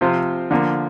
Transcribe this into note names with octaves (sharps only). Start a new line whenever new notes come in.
C3 F3 C4 F4
D3 F3 A#3